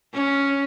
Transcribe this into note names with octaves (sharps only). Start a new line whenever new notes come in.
C#4